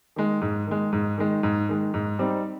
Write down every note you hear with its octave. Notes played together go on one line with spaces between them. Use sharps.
D#3 G#3
G#2
D#3 G#3
G#2
D#3 G#3
G#2
D#3 G#3
G#2
G3 C4 D#4